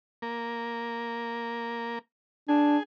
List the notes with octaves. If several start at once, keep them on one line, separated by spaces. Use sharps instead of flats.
A#3
D4 G#4